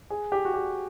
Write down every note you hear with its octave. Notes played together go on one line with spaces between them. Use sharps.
G#4
G4
F#4
G4